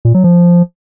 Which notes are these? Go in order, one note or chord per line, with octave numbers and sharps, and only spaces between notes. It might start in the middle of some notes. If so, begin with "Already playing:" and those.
A#2
F#3
F3